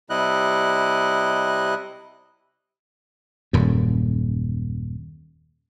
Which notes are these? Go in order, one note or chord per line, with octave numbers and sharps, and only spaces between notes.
C3 G3 E4 D#5 F#6
D#1 F#2